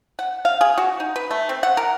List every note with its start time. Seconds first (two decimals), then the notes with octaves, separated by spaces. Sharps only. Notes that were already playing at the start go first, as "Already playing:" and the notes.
0.19 F#5
0.45 F5
0.61 G#4
0.78 F#4
1.00 D#4
1.16 B4
1.31 A3
1.49 C4
1.63 F#5
1.77 A#4